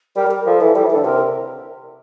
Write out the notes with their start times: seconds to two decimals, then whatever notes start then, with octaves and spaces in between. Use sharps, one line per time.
0.16 G3 A#4
0.26 G3
0.31 A#4
0.46 F3 A4
0.61 E3 A4
0.75 G3 A4
0.85 E3
0.90 D3 A4
1.05 C3 A#4